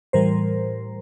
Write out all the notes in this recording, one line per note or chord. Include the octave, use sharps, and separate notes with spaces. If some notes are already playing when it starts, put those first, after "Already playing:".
A2 E3 G3 A#4 C5